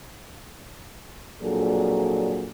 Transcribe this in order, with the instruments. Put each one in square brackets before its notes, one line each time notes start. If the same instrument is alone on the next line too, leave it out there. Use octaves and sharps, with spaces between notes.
[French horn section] F2 A#2 F#3 D4 G#4 A4